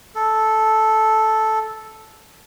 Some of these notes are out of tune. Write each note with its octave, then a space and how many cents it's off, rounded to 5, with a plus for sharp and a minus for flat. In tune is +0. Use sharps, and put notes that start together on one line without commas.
A4 -5